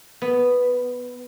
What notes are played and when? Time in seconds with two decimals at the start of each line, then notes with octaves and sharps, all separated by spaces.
0.22 B3